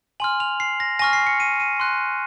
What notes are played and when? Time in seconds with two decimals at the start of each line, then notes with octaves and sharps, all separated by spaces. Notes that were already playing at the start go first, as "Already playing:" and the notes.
0.20 G#5 C6 F6 F#7
0.40 F7
0.60 C7
0.80 A#6
0.99 G#5 C#6 F6 A#6
1.13 C7
1.27 C#7
1.40 D#7
1.60 D#7
1.80 C6 F#6